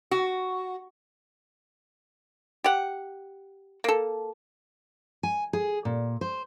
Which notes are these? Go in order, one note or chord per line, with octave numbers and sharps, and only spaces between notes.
F#4
G4 F#5
A#3 A4
G#5
G#4
A#2
C5